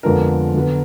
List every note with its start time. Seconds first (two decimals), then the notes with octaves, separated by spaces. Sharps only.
0.03 F2 D3 F3 G#3 B3 A#4
0.54 D3 F#3 B3